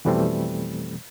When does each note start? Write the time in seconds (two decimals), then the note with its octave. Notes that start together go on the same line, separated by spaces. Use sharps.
0.05 F2 B2 E3 G3 A3 C4